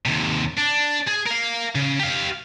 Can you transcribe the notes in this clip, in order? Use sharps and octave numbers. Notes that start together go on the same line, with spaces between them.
D#2 C3
D4
G#4
A#4 F5
C#3
G4 F5